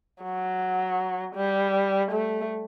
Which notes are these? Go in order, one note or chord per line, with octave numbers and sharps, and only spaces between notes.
F#3
G3
A3